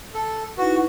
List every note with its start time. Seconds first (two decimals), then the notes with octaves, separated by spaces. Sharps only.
0.14 A4
0.58 D#4 E4 F#4 B4